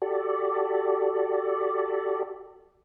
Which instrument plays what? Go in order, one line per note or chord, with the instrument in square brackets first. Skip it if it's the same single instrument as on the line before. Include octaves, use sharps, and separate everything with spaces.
[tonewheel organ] F#4 G4 A4 D5